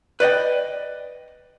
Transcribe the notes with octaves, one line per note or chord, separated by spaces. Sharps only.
B4 D5 D#5 G5